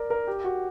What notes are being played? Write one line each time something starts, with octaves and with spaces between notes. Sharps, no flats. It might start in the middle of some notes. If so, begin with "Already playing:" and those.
Already playing: A#4 D5
A#4
G4
F#4